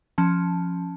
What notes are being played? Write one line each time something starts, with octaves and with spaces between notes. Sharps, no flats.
F3 C#4 A5